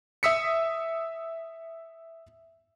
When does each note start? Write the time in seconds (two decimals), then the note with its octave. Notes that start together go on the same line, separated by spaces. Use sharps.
0.23 E5 D#6 E6 B6 C#7